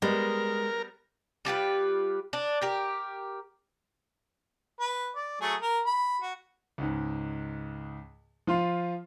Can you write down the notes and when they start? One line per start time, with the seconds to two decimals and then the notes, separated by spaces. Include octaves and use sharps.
0.02 G3 G#3 B3 A#4
1.45 G3 F4 G4 B4
2.33 D4
2.62 G4 A#4
4.80 B4
5.16 D5
5.41 F#3 A3 G#4
5.62 A#4
5.86 B5
6.22 F#4
6.78 C#2 G#2
8.47 F3 F4 C6